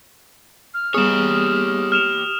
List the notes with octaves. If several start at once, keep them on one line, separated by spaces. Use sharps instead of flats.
F6
G3 B3 G4 G#4 C#5 D#6 E7
F6 E7 F7